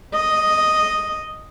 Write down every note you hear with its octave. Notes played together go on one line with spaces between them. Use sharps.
D#5